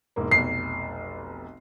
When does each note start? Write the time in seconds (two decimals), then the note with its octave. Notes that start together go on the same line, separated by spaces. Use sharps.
0.16 E1 G#2 A#3
0.31 F1 B1 C7